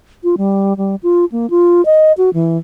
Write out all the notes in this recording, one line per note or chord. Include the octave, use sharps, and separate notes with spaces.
F4
G3
G3
F4
A#3
F4
D#5
F#4
E3